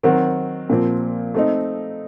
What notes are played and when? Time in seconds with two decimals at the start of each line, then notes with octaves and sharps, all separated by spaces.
0.03 D#3 F#3 C4 F#4
0.70 A#2 F3 C4
1.34 A3 C4 D#4